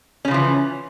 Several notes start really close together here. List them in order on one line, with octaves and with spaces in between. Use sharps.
C#4 C#3 F3 E3